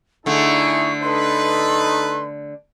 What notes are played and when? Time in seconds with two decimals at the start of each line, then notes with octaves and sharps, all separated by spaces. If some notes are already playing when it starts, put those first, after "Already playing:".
0.26 D3 A3 D#4 E4 G#4 C#6
1.02 D#4 A4 B4 C6